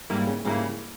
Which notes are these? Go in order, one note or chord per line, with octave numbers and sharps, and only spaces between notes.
G#2 D#3 G3 A#3 E4
C#3
G#2 C#3 G3 A#3 E4